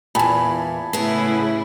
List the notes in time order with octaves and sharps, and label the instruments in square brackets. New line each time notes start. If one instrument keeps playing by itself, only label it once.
[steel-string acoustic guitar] E2 A#2 [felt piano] G#5 A5 B5
[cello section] A2 C#3 E4 [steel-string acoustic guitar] B3 G#4